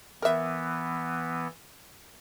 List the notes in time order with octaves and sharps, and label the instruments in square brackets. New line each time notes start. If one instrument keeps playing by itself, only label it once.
[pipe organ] E3 B3 [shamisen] A#4 E5